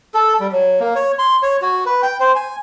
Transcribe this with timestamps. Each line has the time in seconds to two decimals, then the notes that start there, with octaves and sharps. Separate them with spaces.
0.14 A4
0.40 G3
0.52 F#3
0.80 A#3
0.95 C#5
1.19 C6
1.43 C#5
1.62 F#4
1.86 B4
2.02 G5
2.20 C5
2.36 G#5